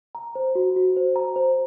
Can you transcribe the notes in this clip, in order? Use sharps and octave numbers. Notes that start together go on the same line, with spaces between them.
A#5
C5
F#4
F#4
C5
A#5
C5